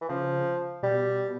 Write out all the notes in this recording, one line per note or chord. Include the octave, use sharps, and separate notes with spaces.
E3
C#3 F3
B2 G3